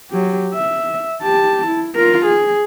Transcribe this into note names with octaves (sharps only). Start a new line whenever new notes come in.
F#3 G4
E5
G4 A5
E4
F4 A#4
G#4